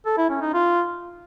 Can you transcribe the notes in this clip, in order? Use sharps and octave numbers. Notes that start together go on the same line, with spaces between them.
A4
E4
C#4
D#4
F4